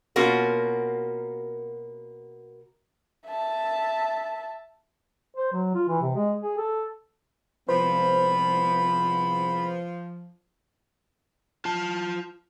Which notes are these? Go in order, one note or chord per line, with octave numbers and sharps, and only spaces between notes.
B2 A#3 C#4 F4 F#4 A#4
E5 A5
C5
F#3
F4
E3
C3
G#3
G#4
A4
C2 F3 G#3 B3 B4 C5 B5
F4 A5